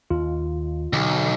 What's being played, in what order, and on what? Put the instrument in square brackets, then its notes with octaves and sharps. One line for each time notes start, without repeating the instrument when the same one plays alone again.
[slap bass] D#2 [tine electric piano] F4
[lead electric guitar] B1 [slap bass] D3 E3